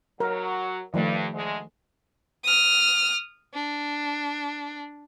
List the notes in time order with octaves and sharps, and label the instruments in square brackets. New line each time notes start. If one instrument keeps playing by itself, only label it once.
[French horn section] F#3 [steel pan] A#4
[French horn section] G2 [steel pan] D#3 F3 A3
[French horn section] D2 G#3
[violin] D#6 F6
D4